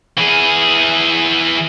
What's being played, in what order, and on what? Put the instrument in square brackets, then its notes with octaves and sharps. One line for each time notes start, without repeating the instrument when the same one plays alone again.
[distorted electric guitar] E3 G#4